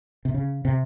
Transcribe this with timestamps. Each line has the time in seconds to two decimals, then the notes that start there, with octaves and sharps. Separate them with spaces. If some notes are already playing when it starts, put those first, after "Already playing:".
0.25 C3
0.34 C#3
0.65 C3